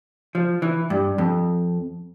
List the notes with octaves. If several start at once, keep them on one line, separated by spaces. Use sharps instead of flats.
F3
E3
G2
F2